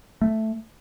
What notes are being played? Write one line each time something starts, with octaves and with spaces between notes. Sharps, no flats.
A3